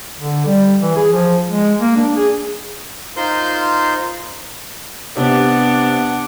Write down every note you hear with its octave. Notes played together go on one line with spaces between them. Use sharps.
D3
G3
E3
G#4
F3
G#3
A#3
D4
G#4
D#4 F4 A#4 C5 C6 G6
C3 B3 D4 F#5